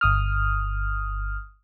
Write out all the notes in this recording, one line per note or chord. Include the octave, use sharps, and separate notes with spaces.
G1 D#6 F6